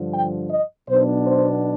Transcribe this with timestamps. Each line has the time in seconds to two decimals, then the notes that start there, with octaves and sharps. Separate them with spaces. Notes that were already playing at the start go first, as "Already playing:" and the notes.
Already playing: G2 D3 F3
0.13 G5
0.51 D#5
0.88 B1 B2 B3 D4 C5
1.26 C5